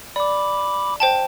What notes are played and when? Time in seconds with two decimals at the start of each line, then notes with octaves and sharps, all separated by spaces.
0.16 D5 B5 D6
1.00 C5 G5 A5